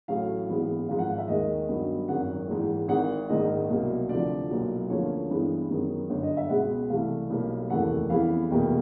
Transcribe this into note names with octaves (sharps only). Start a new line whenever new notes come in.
A1 A2 F#3 A3 F5
A#1 G#2 E3 G#3 B3
G#1 G#2 F3 F5
F#5
F5
E5
D#2 D#3 G#3 D#5
G2 D#3 F#3 B3
G#1 F#2 D#3 F#5
A#1 G#2 E3
G#1 G#2 D#3 F#5
A#1 G#2 D#3 D#5
C2 B2 F#3 A#3
D2 C3 F3 D5
B1 A#2 F#3
D2 C#3 F3 A#3 C#5
G2 E3 G#3 B3
F#2 D#3 G#3 B3
G1 F#2 D3 C#5
D#5
E5
C#2 B2 G#3 B3 F#5
C2 C3 E3 A3 F5
B1 B2 G3 A#3
F1 D#2 C#3 E3 A3 F#5
F2 C#3 E3 G3 B3 F5
F1 E2 B2 G3 A#3 G5